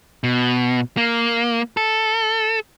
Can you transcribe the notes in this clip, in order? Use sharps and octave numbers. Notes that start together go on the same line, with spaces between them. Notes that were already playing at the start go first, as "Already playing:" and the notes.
B2
A#3
A4